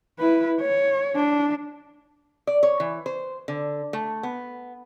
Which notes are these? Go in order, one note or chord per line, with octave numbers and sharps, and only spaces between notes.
E4 B4
C#5
D4
D5
C#5
E3
C5
D3
A3
B3